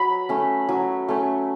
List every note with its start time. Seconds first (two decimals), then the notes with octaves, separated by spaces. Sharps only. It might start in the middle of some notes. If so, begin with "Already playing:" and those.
Already playing: F#3 B5
0.29 A3 C#4
0.69 F#3
1.08 A3 C#4